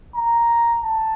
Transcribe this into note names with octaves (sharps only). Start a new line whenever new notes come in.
A#5
A5